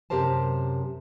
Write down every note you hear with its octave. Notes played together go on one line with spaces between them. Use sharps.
F#2 C3 G4 A#4 C5 A5